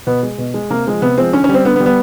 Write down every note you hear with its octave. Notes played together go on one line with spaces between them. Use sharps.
B2 B3
G#3
B2
G#3
C3 A#3
F3 G#3
C3 B3
F3 G#3 C4
D3 C#4
C#4
G3 C4
D3 B3
B3
G3
B3